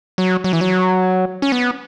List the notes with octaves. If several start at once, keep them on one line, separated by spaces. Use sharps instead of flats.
F#3
F#3
E3
F#3
C#4
B3